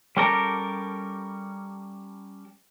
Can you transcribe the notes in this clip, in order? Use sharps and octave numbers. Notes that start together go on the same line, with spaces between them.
G3 C#4 G4 A4 A#4